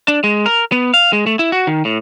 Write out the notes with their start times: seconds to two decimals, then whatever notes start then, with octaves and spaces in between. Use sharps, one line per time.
0.08 D4
0.24 G#3
0.46 A#4
0.72 B3
0.94 F5
1.13 G#3
1.27 A3
1.39 E4
1.52 F#4
1.67 D#3
1.85 A2